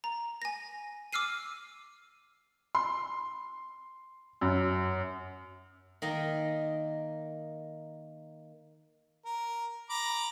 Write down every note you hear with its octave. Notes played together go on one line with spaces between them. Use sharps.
A#5
G#5 A#6
D6 E6 F6 C7 D#7
C6
F#2
D#3 A#3 D#5
A#4
A#5 B5 D6